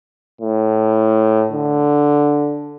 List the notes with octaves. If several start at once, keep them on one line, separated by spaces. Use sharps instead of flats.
A2
D3